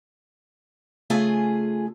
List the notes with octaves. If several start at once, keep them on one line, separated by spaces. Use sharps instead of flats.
C#3 A3 F4 G#4 G#5